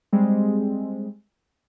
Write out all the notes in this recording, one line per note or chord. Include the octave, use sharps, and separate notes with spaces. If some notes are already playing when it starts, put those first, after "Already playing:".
G3 G#3 C4